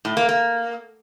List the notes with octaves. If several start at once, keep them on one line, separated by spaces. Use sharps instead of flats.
A2
A#3
A#3